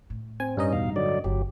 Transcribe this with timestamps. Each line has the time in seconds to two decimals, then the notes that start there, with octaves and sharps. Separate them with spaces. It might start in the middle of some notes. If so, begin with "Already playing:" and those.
0.10 A2
0.40 C4 G#5
0.57 G2 C#4 D#4 D#5
0.73 E2 B2 F5
0.96 D3 F#3 D5
1.24 G1 F2 F#3 G4